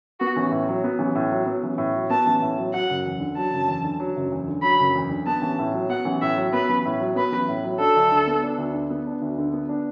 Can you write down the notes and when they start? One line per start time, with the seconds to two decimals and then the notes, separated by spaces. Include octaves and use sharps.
0.20 B3 F#4
0.36 A1
0.51 A2
0.68 F#3
0.84 B3
0.99 A1
1.15 A2
1.32 F#3
1.46 B3
1.63 A1
1.78 A2
1.94 F#3
2.10 B3 A5
2.27 A1
2.42 A2
2.58 F#3
2.74 F#3 F#5
2.90 F#1
3.05 E2
3.20 D3
3.37 F#3 A5
3.53 F#1
3.68 E2
3.84 D3
4.00 F#3
4.16 F#1
4.32 E2
4.48 D3
4.63 F#3 B5
4.79 F#1
4.95 E2
5.11 D3
5.27 B3 A5
5.42 A1
5.59 A2
5.74 F#3
5.90 B3 F#5
6.05 A1
6.22 A2 E5
6.37 F#3
6.53 B3 B4
6.69 A1
6.85 A2
7.00 F#3
7.16 B3 B4
7.32 A1
7.49 A2
7.64 F#3
7.79 D4 A4
7.96 D2
8.11 D3
8.27 B3
8.44 D4
8.58 D2
8.74 D3
8.90 B3
9.07 D4
9.22 D2
9.38 D3
9.53 B3
9.69 D4